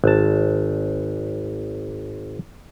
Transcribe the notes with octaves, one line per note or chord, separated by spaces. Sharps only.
G#1 A5